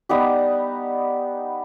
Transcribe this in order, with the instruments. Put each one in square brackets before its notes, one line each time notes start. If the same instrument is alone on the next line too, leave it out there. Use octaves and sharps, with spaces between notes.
[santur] G3 B3 D#4 G4